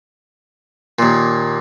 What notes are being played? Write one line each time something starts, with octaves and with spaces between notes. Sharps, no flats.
D#2 A#2